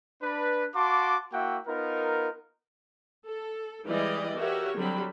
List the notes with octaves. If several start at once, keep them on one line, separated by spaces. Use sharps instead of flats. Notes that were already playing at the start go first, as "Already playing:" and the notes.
D4 B4
F#4 F5 A5 C6 D6
A#3 E4 F#4 E5 F#5 G5
B3 D#4 F4 A#4
A4
E3 G3 G#3 E4 D5 D#5
F#4 G4 A4 A#4 C#5 E5
D3 F#3 G3 C4 B5